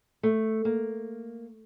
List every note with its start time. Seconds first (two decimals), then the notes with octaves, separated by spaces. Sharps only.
0.23 A3
0.65 A#3